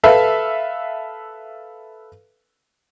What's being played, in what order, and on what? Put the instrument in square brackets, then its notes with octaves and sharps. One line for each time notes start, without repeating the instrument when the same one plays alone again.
[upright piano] A4 B4 E5 F5